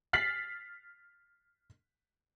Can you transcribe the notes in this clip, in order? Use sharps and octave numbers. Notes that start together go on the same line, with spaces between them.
F6 A6 B6 C7 F#7